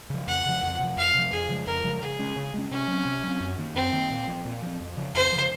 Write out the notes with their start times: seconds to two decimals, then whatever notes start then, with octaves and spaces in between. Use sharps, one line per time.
0.10 C#3 F3
0.27 F2 F#5
0.46 C#3 F3
0.63 F2
0.79 C3 F3
0.97 F2 F5
1.15 C3 F3
1.32 F2 G#4
1.49 C#3 F3 G#3
1.66 F2 A#4
1.84 C#3 F3 G#3
2.01 C#3 G#4
2.19 G#3 C#4
2.36 C#3
2.54 G#3 C#4
2.71 C3 C#4
2.88 F#3 C4
3.05 C3
3.24 F#3 C4
3.40 F#2
3.58 D#3 A#3
3.75 F#2 C4
3.93 D#3 A#3
4.10 A#2
4.28 F3 C4
4.45 A#2
4.62 F3 C4
4.80 F2
4.97 C#3 F3
5.14 F2 C5
5.32 C#3 F3